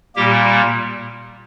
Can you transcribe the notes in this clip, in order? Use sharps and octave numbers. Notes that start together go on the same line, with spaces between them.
A#2 G3 A#3 G4